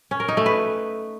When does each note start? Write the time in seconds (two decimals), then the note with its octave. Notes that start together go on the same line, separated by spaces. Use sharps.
0.11 C#4
0.20 A#4
0.28 D#4
0.37 A3
0.46 B4